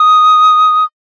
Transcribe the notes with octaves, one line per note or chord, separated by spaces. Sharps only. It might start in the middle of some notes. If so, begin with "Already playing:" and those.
Already playing: D#6